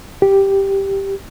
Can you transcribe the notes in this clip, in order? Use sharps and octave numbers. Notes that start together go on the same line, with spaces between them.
G4